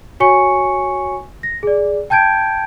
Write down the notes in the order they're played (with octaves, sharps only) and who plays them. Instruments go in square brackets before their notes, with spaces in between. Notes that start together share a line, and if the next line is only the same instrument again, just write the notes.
[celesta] F#4 C#5 G#5 C#6 C#7
A#6
G#4 D5
G5 A5 G6 G#6 D7